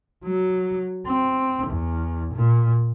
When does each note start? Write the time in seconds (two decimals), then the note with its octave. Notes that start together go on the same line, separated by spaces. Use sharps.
0.25 F#3
1.07 C4
1.67 E2
2.34 A#2